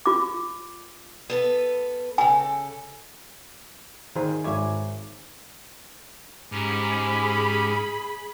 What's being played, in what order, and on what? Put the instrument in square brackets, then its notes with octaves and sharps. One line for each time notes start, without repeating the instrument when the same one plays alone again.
[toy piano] F4 D6
[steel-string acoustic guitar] B3 A4 B4
[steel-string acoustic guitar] C#3 A4 [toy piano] G#5
[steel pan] D#3 G#4 C5 [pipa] F4
[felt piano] G#1 D6 [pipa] C#5 E5 G#5
[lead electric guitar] G#2 [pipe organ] C#4 G4 [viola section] G#4 B5